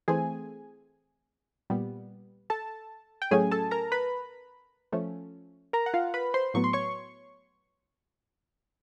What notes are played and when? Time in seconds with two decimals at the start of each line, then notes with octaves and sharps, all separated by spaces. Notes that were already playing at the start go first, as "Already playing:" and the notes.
0.08 E3 A3 C4 G#4 G#5
1.70 A#2 G3 B3
2.50 A4 A5
3.22 G5
3.31 A2 F#3 A3 C#4 G#4 G#5
3.51 A4 A5
3.71 A#4 A#5
3.92 B4 B5
4.92 F3 A3 C#4
5.73 A#4 A#5
5.86 F#5
5.94 F4 F5
6.14 B4 B5
6.34 C5 C6
6.54 A2 F#3 B3 C#6
6.64 C6
6.73 C#5 C#6